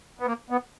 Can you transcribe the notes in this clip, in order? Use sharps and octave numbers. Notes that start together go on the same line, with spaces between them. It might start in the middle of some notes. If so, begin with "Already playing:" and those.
B3
A#3
B3